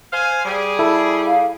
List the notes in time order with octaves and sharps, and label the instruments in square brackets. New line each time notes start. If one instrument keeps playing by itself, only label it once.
[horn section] C5 F5 G#5
G3 G#4
[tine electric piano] E4 A4
[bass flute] F5